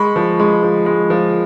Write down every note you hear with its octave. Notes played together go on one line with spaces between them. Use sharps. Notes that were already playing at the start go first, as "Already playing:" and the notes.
Already playing: G#3 B5 C#6
F3
G#3
F3
G#3
F3